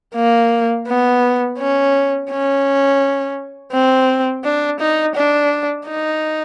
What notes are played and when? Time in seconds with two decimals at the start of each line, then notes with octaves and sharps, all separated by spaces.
0.15 A#3
0.87 B3
1.58 C#4
2.30 C#4
3.73 C4
4.44 D4
4.80 D#4
5.15 D4
5.87 D#4